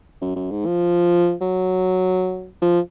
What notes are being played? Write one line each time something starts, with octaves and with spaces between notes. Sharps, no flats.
F#2
F#2
G#2
F3
F#3
F3